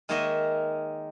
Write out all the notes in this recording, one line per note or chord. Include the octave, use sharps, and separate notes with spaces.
D#3 G#3 A#3 C#5 D#5 E5